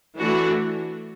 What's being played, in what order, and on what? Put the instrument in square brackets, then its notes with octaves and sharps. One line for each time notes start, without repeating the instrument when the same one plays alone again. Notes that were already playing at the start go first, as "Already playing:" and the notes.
[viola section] E3 A3 D4 F#4